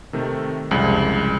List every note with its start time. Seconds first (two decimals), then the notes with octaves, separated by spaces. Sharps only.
0.13 C3 D#3 A3
0.71 C2 F2 C#3 G#3